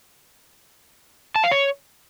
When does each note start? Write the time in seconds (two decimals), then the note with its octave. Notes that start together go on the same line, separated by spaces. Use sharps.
1.36 A5
1.44 F5
1.52 C#5